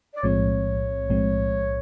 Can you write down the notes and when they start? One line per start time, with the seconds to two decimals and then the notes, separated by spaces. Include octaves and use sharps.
0.16 D5
0.23 B1 A2 F3 G#3 C4 C#5
1.09 B1 A2 F3 G#3 C4